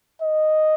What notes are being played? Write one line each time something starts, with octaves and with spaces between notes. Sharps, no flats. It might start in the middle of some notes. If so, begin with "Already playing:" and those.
D#5